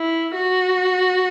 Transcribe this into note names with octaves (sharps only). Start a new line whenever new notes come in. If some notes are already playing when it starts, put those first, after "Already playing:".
Already playing: E4
F#4